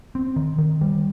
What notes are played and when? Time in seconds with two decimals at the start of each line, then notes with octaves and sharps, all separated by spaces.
0.15 C4
0.36 D#3
0.58 D#3
0.81 G3